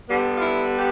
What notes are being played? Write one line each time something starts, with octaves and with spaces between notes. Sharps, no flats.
D3 G3 B3
F4
E4
G4